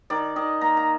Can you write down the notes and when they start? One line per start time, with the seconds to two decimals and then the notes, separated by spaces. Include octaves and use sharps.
0.10 D#3 D5
0.36 D#3 D#5
0.61 A#3 A#5
0.77 A#5